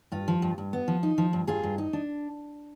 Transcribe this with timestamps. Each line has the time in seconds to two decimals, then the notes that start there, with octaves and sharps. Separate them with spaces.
0.12 G2 F4
0.28 F3
0.42 G2
0.58 G2
0.73 B3
0.88 F3
1.03 D#4
1.18 F3
1.33 G2
1.47 G2 F4 G#4
1.63 G2
1.78 D#4
1.93 D4